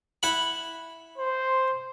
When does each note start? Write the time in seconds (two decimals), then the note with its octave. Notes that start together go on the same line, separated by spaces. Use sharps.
0.23 E4 F#5 B5
1.18 C5